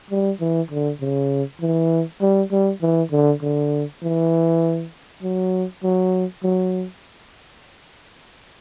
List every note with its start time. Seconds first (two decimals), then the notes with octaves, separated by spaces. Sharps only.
0.10 G3
0.40 E3
0.71 D3
1.01 C#3
1.61 E3
2.21 G3
2.51 G3
2.82 E3
3.12 D3
3.42 D3
4.02 E3
5.23 F#3
5.83 F#3
6.43 F#3